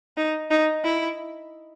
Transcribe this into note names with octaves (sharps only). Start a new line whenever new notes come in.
D#4
D#4
E4